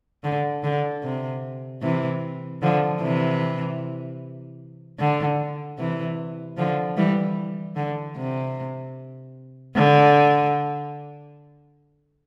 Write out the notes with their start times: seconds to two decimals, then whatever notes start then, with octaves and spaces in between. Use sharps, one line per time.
0.23 D3
0.63 D3
1.03 C3
1.82 C3 E3
2.62 D3 F3
3.01 C3 E3
5.00 D3
5.79 C3 E3
6.57 D3 F3
6.97 E3 G3
7.76 D3
8.16 C3
9.75 D3